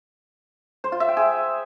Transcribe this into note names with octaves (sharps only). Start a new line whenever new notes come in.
C5
F4
E5
G5
G#4